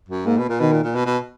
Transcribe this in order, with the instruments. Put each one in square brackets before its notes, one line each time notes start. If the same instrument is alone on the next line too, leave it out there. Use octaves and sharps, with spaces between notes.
[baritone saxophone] F#2
[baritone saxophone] G#2 [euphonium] A#3
[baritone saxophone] B2
A#2
[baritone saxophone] B2 [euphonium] D#3
[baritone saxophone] A#2
A#2
B2
B2